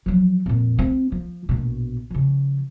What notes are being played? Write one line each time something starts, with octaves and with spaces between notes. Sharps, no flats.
F3 F#3
F2 A#2
C4
F3
A#1 B2
C#3 F3